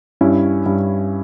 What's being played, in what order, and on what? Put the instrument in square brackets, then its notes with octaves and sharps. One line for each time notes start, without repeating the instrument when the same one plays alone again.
[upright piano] G2 [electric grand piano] C#4 E4
[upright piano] G2